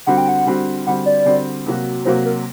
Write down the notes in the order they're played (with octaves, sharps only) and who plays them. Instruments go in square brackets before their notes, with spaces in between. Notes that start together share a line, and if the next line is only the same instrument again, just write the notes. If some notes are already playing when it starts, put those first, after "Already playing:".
[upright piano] D3 G3 C4 F#4 [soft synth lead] F#5
[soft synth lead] G5
F#5
[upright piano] D3 G3 C4 F#4
[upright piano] D3 G3 C4 F#4 [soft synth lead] F#5
[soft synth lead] D5
[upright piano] D3 G3 C4 F#4
C3 F#3 A#3 F#4
[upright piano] C3 F#3 A#3 F#4 [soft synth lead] C5
[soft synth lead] A#4